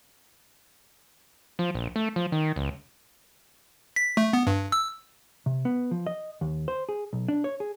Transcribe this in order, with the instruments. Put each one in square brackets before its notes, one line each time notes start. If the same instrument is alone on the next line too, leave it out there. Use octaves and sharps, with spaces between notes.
[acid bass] F3
A#1
A3
F3
D#3
C#2
[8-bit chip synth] B6
A3
B3
G2
E6
[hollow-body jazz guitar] C3
B3
F3
D#5
D#2
C5
G#4
B1
D4
C#5
G#4